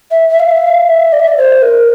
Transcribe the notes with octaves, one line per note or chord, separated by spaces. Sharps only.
E5
E5
F5
E5
F5
E5
D5
E5
D5
C5
A#4